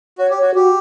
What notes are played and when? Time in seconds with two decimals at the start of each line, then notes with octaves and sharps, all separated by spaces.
0.18 F#4 C#5
0.30 G4
0.36 C#5
0.42 F#4
0.54 F#4 G4